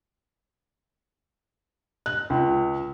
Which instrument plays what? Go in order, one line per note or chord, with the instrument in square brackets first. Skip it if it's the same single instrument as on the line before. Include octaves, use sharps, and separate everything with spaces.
[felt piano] F#6
C#2